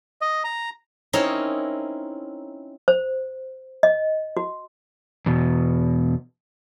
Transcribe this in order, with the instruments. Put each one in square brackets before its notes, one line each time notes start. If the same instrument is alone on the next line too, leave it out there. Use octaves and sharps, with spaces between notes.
[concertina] D#5
A#5
[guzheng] C4 C#4 D#4 E4 A#4 C#5
[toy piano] C5
D#5
F#4
[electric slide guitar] E2 B2